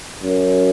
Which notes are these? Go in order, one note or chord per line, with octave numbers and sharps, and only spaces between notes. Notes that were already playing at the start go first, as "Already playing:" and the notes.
F#2